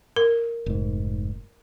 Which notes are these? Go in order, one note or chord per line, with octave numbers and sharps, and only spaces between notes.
A#4
F1 G#2